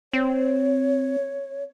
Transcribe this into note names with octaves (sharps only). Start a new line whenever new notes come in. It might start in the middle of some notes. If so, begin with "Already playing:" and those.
C4 C#5